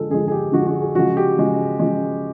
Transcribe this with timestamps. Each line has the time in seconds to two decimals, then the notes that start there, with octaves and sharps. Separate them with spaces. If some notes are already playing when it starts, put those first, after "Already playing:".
Already playing: D3 F3 G#3 A4
0.10 D3 F3 G#3 G#4
0.28 G#4
0.32 G4
0.52 D3 F3 G#3 F#4
0.67 F#4
0.82 G#4
0.95 C#3 F3 G#3 F#4
1.17 G4
1.37 C#3 F3 G#3
1.79 C#3 F3 G#3